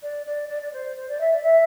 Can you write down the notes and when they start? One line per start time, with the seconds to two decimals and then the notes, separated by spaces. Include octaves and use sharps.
0.02 D5
0.26 D5
0.49 D5
0.62 D5
0.73 C5
0.96 C5
1.08 D5
1.20 E5
1.32 D5
1.43 E5